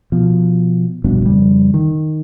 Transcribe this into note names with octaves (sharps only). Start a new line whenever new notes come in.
B2 F3
F1 G2 B2 D4
F2 C#3 G3
D#3